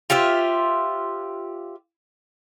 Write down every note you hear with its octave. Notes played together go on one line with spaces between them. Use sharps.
F4 G4 C5 E5